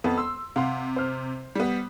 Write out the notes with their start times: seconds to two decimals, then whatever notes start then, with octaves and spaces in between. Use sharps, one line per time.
0.04 F2 B3
0.18 C6 E6
0.56 C3 F5 F#5 C6
0.96 C5 F6
1.55 G3 B3